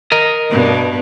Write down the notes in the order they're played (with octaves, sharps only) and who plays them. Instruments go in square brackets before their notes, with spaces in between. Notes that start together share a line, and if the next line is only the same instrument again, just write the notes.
[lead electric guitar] A#4 D#5
[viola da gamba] G2 B2